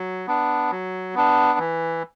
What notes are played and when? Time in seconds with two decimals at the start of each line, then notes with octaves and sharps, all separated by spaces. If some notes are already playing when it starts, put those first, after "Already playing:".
Already playing: F#3
0.27 B3 D4
0.71 F#3
1.15 B3 D4
1.59 E3